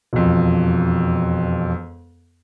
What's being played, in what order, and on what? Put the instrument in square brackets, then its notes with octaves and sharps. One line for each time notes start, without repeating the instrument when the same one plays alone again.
[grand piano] E1 F2